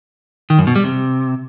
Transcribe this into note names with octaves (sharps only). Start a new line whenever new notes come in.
D#3
F#2
B2
G3
C3